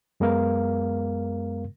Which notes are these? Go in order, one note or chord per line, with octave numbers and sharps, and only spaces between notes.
F#2 G#3 B3 A#4 F5